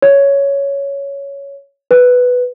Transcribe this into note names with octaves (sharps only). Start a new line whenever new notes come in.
C#5
B4